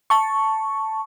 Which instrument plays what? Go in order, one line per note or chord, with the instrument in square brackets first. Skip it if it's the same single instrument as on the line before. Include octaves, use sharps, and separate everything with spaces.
[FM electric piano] A5 C#6